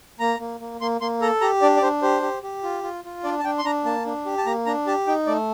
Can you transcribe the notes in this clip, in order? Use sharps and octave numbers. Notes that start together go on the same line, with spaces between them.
A#3 A#5
A#3
A#3
A#3 C6
A#3 C6
A4 A#5
G4 A#5
D4 D5
D5
D4 C5
G4 C5
G4
G4
F4
F4
F4
D4 D5
A5
D4 G5
C6
D4 A#5
A#3 A5
D4
G4
A5
A#3 A#5
D4 A#5
G4 A5
D#4 G5
A3 D5